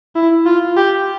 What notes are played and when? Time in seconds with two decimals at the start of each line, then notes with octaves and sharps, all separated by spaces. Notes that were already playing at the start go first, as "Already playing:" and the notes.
0.15 E4
0.46 F4
0.77 G4